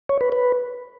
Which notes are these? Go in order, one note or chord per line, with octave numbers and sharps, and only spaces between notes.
C#5
B4
B4